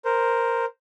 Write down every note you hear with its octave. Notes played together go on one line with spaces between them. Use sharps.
A#4 C5